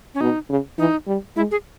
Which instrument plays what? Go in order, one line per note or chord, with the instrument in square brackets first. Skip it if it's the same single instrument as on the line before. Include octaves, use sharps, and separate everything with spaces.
[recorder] C#4
[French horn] B2 [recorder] D#4
[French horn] C#3
[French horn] E3 [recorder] D#4
[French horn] G3
[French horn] G#3 [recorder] E4
[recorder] G#4